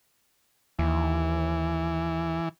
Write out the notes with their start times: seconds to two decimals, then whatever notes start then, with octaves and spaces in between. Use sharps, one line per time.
0.79 D#2 E3